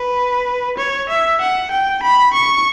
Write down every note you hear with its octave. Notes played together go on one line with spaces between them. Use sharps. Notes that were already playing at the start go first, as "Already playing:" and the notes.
Already playing: B4
C#5
E5
F#5
G5
B5
C#6